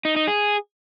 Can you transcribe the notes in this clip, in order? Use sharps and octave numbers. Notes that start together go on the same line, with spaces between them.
D#4
D#4
G#4